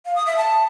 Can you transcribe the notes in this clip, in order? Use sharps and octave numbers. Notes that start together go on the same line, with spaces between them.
F5
D#6
E5
A5